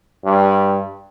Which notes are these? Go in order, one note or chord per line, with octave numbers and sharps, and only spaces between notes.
G2